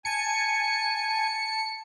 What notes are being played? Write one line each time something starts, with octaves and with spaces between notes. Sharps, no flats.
G#5 A5 C#7